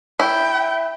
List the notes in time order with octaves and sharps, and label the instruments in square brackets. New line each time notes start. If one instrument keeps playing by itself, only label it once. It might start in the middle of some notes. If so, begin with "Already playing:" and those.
[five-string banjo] E4 [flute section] E5 [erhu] G5